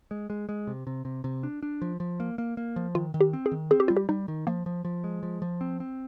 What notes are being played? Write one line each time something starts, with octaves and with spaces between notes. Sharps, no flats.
G#3
G#3
G#3
C3
C3
C3
C3
D4
D4
F3
F3
A#3
A#3
A#3
F3
D#3 F4
D#3
G4
C4
G#4
D#3
C4 G#4
G4
G3 F4
G4
G3 D#4
D#3
F3 A#3
F3
F3
G#3
F3
F3
C4
C4